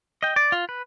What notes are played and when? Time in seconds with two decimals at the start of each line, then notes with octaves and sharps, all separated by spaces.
0.23 D#5 G5
0.36 D5
0.52 F4
0.69 B4